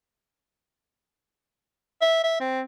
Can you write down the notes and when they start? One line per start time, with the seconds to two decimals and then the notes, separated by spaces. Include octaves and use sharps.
2.02 E5
2.24 E5
2.40 C4